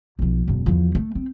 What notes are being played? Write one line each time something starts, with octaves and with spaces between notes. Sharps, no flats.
B1 F3
E1 F#2
E2 F3
A3
C4